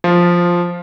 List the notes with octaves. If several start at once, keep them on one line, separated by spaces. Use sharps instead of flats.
F3 F4